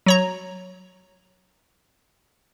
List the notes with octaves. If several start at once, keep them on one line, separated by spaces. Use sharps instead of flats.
F#3 C#5 A#5